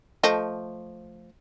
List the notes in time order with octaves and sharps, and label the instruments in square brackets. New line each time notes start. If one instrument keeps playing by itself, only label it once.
[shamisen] F3 A3 D#5